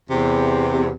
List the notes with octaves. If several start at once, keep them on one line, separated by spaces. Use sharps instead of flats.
E2 C3